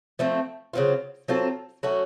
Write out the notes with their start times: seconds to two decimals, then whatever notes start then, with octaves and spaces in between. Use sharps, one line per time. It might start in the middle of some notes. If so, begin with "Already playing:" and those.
0.19 F3 A3 C4
0.73 C#3 F#3 C4 F4
1.28 F#3 C4 F4 A4
1.83 F#3 A3 C#4 F#4